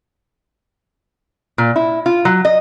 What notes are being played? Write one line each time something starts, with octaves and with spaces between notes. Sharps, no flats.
A#2
E4
F4
F#3
D#5